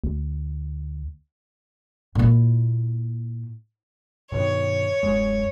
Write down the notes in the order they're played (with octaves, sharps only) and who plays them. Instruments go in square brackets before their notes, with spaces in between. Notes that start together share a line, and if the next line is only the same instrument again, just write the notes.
[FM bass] D2
[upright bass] A#2 E4
[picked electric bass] G2 B2 D#3 [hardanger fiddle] C#5
[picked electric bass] D1 F#2 G#3